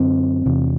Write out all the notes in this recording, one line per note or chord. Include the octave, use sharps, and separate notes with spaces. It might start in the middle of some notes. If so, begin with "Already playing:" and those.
Already playing: F#2 D3 C4
E2 C3